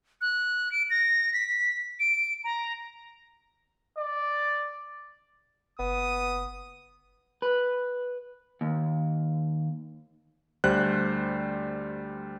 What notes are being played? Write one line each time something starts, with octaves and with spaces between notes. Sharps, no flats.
F#6
D7
A#6
B6
D7
A#5
D5
F#1 B3 D#6
B4
D#2
D2 G3 C5 F#6